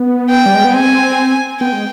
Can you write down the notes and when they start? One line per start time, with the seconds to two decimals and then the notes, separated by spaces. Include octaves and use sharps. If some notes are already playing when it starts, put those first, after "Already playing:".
Already playing: B3
0.30 G5
0.46 G3
0.55 G#3
0.64 B3
0.73 C4 G#5
1.60 B3 G5
1.73 G#3